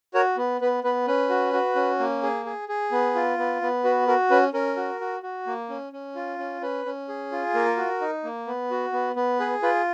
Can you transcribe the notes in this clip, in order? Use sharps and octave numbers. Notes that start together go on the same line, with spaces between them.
F#4 A#4 C#5
B3
B3 B4
B3 B4
C#4 B4
F#4
F#4
C#4
A#3
G#4
G#4
G#4
B3
F4
B3
B3
F#4 B4
F#4 A#4
C#4 B4
C#4 A#4
F#4
F#4
F#4
A#3
C#4
C#4
F4
C#4
C#4 B4
C#4
G#4
F4
A#3 A#4
F#4
D#4
A#3
B3
F#4
B3
B3
G#4 B4
F4 B4